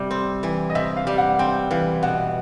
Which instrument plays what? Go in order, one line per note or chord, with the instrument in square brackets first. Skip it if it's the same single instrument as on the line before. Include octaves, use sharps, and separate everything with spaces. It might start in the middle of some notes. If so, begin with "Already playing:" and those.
Already playing: [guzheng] C3 G3
C4
E3
[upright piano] D#5
[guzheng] C3 [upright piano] E5
[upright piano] F5
[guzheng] G3
[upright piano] F#5
[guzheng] C4 [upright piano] G5
[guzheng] E3 [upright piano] F5
[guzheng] B2 [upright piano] F#5